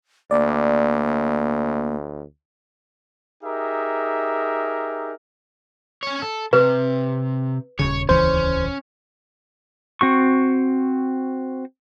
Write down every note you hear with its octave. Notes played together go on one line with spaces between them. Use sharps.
D2 A#3 D5
D#4 G4 G#4 A#4 E5
C#4 C#5
A4
C3 B4
D#1 A#1 C#3 C#5
D#1 C#2 E3 C#4 C5
C4 F#4 C#6